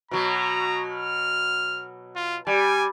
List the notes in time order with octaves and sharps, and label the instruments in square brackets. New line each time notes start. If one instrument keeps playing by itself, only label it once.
[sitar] B2 F#3 [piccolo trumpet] A#5
[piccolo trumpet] F6
F4
[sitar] G3 [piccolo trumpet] G#5